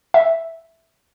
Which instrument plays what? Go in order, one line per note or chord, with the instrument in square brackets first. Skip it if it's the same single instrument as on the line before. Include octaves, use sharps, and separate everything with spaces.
[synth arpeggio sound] E5